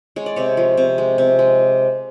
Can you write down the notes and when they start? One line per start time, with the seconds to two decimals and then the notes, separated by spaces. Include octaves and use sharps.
0.16 G#3 C#5
0.26 D5
0.36 C3 C#5
0.57 F3
0.77 C3
0.98 G#3
1.18 C3
1.39 G#3